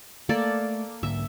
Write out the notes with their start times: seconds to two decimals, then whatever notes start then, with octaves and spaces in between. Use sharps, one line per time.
0.29 A3 A#3 A4 D5
1.03 G#2 D3 A#3 E5